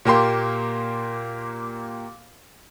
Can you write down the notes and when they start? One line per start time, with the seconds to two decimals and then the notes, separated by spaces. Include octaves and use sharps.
0.05 A#2 A#3 G4 C6